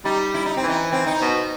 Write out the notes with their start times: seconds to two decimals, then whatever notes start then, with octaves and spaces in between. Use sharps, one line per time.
0.05 G3 D#4
0.34 E4
0.46 D#4
0.57 C4
0.63 E3 D#4
0.92 C4
1.07 D#4
1.21 B2